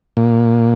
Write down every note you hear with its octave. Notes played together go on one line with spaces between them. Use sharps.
A#2